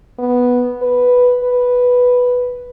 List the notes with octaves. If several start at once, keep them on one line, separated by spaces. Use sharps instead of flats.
B3
B4
B4